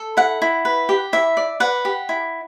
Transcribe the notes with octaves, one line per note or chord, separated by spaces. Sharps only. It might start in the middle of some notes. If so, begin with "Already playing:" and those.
Already playing: A4
E4 F#5
E4
B4
G4
E4 E5
D5
B4 F#5
G4
E4